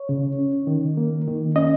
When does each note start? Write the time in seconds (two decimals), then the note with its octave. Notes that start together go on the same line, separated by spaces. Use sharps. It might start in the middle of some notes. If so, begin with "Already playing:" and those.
Already playing: C#5
0.09 C#3
0.39 C#4
0.67 D#3
0.97 A#3
1.27 D#3
1.56 C#4 D#5